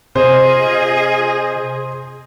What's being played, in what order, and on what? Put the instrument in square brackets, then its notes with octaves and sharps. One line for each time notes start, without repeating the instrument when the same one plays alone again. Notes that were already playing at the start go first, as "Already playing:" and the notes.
[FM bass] C3 [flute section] F4 D#5 [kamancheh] G#4 [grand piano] C5